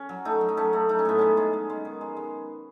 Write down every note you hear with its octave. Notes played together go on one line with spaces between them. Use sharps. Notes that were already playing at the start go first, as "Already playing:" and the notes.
Already playing: C#4
F#3
A3 D#4
F#3
D#4
A3 C#4
A3
A3 D#4
C#4
A2 B3
G#3 C#4
G#3
G#3
G#3
D#3
G#3
G#3